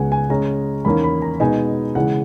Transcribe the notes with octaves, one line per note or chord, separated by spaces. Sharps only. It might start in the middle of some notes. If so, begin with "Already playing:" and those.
Already playing: C#2 C#3 G#3 B3 F#5 G#5
G#5
C#3 G#3 C#4 A#5
E2 D#3 A#3 C#4 B5
B5
A#5
B2 G#3 B3 D#4 G#5
C#3 E3 G#3 F#5